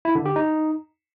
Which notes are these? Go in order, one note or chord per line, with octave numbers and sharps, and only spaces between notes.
E4
D3
G4
D#4